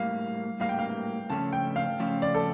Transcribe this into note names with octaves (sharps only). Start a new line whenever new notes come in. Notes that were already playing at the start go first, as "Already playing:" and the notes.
Already playing: A2 G3 A#3 F5
A2 G3 A#3 F5
G5
F5
C#3 F3 A3 C#4 A5
G5
F5
C#3 F3 A3 C#4
D5
A4